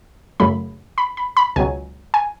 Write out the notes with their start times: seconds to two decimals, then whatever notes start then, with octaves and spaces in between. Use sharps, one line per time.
0.40 F#2 C#3 F#3 A3 B5
0.98 B5
1.17 B5
1.37 B5
1.56 C#2 B2 F#3 G#5
2.14 G#5